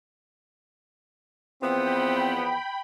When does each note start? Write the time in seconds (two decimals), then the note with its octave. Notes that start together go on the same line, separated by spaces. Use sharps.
1.63 E2 F3 B3 C4 G5 B5